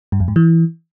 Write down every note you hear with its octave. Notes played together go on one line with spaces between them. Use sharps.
G2
F2
G#2
E3